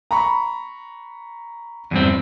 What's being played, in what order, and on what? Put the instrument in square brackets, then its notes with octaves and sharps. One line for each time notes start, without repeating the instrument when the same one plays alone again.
[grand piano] A#5 B5 C#6
[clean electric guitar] E2 G2 C4